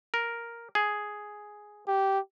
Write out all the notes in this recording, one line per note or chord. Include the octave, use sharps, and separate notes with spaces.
A#4
G#4
G4